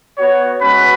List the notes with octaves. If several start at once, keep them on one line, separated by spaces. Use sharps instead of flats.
B3 F#4 C#5
G#3 C#4 F#4 B4